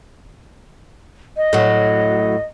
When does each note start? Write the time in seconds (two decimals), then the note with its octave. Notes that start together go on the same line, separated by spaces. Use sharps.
1.37 D#5
1.53 A2 F#3